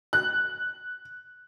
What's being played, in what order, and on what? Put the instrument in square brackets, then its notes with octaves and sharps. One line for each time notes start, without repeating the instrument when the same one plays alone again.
[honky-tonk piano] F#6